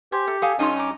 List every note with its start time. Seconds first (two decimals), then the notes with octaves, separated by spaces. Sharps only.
0.12 G4 C5 G#5
0.27 A4 E5
0.42 A4 F5 G#5 D#6
0.59 G2 C#4 D#4 F4 A4 D#5 G5
0.77 A#5 D6